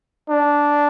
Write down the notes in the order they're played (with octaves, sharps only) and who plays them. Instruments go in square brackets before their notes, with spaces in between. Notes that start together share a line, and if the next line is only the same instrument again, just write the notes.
[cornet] D4